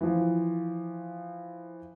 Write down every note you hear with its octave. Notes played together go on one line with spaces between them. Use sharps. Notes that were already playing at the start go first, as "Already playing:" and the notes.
E3 F3